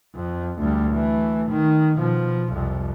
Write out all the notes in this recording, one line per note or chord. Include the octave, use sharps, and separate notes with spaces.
F2
D2 G3
E3 A3
D#3
B2 F3
C2 F2